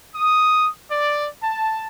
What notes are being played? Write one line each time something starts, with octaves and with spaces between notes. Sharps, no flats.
D#6
D5
A5